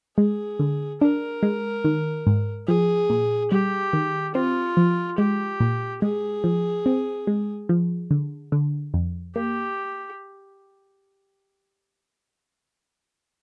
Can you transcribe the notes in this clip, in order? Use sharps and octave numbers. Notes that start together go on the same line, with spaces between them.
G#3 G#4
D3
D4 A#4
G#3
D#3
G#2
F3 G#4
A#2
G3 G4
D#3
C4 F4
F3
G#3 G4
A#2
G#3 G#4
F3
C4
G#3
F3
D3
D3
F2
A#3 G4